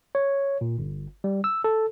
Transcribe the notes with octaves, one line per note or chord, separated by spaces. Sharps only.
C#5
A#2
G1
G3
E6
A4